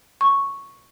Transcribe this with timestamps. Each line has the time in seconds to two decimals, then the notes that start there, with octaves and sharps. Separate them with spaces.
0.21 C#6